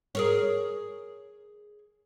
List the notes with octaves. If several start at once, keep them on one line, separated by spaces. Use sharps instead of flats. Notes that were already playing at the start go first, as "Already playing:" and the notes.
G#4 A#4 C#5